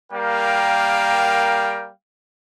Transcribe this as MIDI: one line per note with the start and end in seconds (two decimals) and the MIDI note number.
0.13 1.90 55
0.13 1.90 58
0.13 1.90 70
0.13 1.90 77
0.13 1.90 79